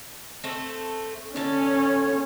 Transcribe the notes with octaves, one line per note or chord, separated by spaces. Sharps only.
A3 C4
D3 C#4 A4